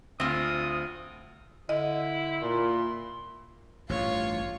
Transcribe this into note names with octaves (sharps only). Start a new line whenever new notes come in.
D2 C4 F4 D#6
D3 E4 D#5
A#2 E5 B5 C6
A1 G2 F4 C#5